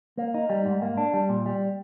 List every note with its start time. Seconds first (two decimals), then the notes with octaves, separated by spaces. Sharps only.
0.17 A#3
0.34 D#4
0.50 G3
0.66 G#2
0.82 A#3
0.97 D4
1.14 G3
1.29 A#2
1.46 G3